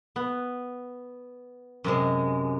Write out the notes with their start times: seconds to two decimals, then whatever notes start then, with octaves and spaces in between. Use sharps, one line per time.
0.16 B3
1.84 F#2 C3 G#3